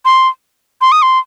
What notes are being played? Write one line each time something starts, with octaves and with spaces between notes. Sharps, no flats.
C6
C6
D#6
C6